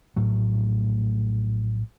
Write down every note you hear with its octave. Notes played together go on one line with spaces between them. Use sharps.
A#1 A2 F#3 A3